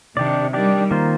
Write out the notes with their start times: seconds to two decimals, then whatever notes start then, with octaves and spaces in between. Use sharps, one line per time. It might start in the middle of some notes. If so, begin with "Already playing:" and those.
0.16 C3 D#3 D4 G4 D5
0.53 D#3 G3 D4 G4 D5
0.91 D#3 A#3 F4 C5